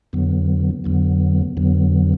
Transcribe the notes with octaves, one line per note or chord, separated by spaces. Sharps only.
F2 D3 F#3 B3
F2 D3 F#3 B3
F2 D3 F#3 B3